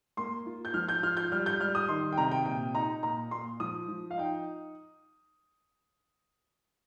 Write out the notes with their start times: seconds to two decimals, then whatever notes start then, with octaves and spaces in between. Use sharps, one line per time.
0.17 A#3 C6
0.46 F4
0.65 G6
0.74 F3 F6
0.89 G6
1.03 F4 F6
1.17 G6
1.32 G3 F6
1.46 G6
1.60 G3 F6
1.75 D#6
1.89 D#3 C6
2.12 G5
2.18 C3 A#5
2.31 G5
2.46 A#2 G5
2.74 D#4 A#5
3.03 A#2 A#5
3.31 A#2 C6
3.60 F3 D#6
3.88 F3
4.11 F5
4.17 D#4 G5